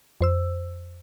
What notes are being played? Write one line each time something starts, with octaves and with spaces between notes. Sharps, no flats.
F2 C5 E6